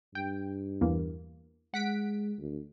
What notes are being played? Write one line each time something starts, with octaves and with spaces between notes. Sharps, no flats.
G2 G5
E2 E3 A#3
G#3 F#5 B6 D7
D2